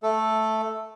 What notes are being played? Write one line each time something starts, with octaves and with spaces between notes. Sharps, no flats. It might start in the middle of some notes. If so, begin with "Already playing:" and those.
A3 A4